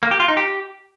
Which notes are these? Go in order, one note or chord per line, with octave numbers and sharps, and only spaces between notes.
A#3
G4
F4
D#4
G4